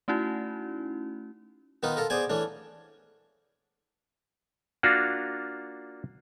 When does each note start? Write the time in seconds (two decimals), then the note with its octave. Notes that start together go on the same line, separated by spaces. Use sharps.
0.08 A3 C#4 D#4 E4 F#4
1.83 D#3 B3 D#4 F4 B4
1.97 F4 A4 A#4
2.10 B3 G#4 C5 D5 G#5
2.30 E3 A3 C#4 D4
4.83 A#3 D4 F4 F#4